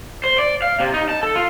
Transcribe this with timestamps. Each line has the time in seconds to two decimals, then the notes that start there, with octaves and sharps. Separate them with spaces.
0.24 C5
0.38 D5
0.62 F5
0.80 C3
0.94 D#4
1.09 A5
1.23 A4
1.35 F4